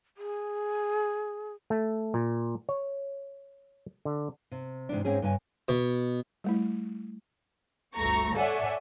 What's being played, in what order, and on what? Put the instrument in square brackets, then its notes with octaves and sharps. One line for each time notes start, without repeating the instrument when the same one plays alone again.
[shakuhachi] G#4
[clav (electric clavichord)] A3
A#2
C#5
D3
[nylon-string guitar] C3
G#2 C3 E3 D4
G#2 A#3 C4 C#4 G#4
G2 C#3 G#5
[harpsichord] B2
[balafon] G3 A3 E4
[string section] G1 D2 A3 A#5 C#6
A4 C#5 D5 E5 F#5 G#5